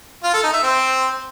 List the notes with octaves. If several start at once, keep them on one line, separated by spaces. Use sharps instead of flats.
F4
A4
D#4
E5
C4